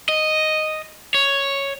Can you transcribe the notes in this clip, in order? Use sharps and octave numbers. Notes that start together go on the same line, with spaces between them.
D#5
C#5